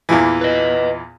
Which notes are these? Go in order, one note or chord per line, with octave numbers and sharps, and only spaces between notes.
E2 A#2 E3
B4 D#5